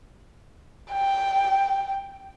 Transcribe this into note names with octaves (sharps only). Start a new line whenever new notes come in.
G5